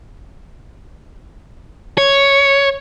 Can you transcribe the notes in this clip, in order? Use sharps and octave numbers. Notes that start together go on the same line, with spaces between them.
C#5